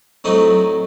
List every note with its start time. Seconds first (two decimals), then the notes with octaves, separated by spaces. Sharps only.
0.24 A2 F#3 A3 C4 D#4